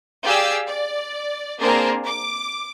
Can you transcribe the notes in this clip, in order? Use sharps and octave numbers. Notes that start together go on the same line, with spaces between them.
G4 G#4 D5 F5 G5 E6
D5
A#3 C4 D4 G#4 A#4 C5
D6